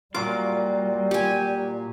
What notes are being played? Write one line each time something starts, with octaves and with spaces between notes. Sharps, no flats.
A#2 F#3 G3 F4 D6
G4 G#5